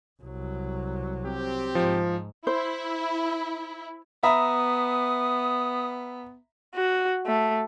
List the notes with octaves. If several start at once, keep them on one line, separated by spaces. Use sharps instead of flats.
C2 F#3
C4 G4
G#2 F3
E4 C5
B3 E5 A#5 B5 D#6
F#4
A3